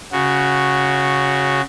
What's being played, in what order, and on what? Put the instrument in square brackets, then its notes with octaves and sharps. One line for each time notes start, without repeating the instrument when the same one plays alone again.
[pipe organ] C#3 F#4